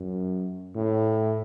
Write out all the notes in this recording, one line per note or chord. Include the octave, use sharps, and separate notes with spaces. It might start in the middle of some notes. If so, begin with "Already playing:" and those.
Already playing: F#2
A2